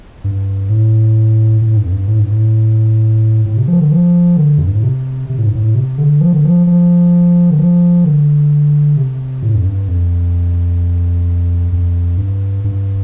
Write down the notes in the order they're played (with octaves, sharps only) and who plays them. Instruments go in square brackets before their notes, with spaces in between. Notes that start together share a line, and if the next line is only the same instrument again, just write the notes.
[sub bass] G2
A2
A2
G2
F2
G2
A2
G2
A2
A2
C3
F3
D3
F3
D3
F2
G2
A2
C3
C3
A2
G2
A2
C3
D3
F3
D3
F3
F3
D3
F3
D3
C3
A2
F2
G2
F2
F2
G2
G2